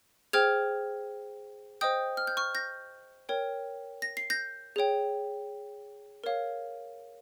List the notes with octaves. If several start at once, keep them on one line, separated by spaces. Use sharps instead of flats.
G#4 C5 G5 F6 G#6
C5 D#5 G5 D#6 G6
F6
G6
C#6 F6
G6 A#6
A#4 C#5 G5
A#6
C7
G6 A#6
G#4 C#5 G5
A#4 C#5 F5